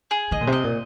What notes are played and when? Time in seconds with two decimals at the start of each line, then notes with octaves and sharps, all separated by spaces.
0.11 G#4
0.31 D3 D#5
0.41 A#2
0.47 C3
0.53 D#5
0.64 A#2